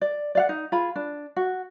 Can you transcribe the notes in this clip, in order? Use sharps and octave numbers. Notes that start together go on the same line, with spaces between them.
D5
D5 F5 F#5
D#4
F4 G#4 B5
D4
F#4